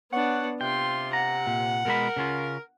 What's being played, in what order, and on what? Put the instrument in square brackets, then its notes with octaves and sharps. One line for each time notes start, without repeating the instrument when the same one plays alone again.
[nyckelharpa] B3 D4 [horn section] C#5 F#5
[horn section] C3 [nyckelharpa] F4 C6 [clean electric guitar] G5
[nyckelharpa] F#5 [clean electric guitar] A#5
[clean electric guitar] A#2
[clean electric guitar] B2 G#3 B5 [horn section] A#4
[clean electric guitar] C#3 C#4 F4